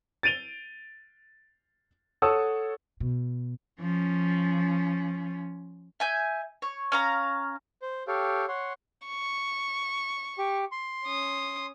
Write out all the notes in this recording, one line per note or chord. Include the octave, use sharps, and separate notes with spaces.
A6 D7 D#7 F7 G7
A4 C#5 F#5 A5 D#6 E6
B2
F3 C#4
E5 G#5 G6
C#5
C#4 F5 A#5
C5
G4 A4 C#5 F5 G5
C#5 F#5 C6
C#6
G4
C6
C#4 D#6